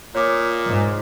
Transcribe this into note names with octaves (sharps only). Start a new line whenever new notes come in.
A#2 C#5 D6 D#6
G#2